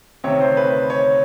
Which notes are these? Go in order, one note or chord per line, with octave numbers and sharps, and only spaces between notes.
D2 C3 D#3 C#5
C5
B4
C#5